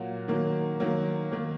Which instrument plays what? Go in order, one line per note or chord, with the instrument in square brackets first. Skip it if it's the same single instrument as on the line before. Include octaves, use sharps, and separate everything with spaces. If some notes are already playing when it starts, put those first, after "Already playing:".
Already playing: [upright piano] A#2 F#3 A#3 F#4
D#3 F#3 A#3
D#3 F#3 A#3
D#3 A#3